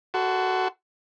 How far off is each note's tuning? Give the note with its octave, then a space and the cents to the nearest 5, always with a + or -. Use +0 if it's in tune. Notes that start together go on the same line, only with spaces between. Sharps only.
F#4 +15 A4 +0 C6 -20